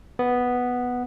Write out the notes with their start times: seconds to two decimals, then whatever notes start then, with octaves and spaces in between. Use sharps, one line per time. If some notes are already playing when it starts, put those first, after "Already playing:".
0.19 B3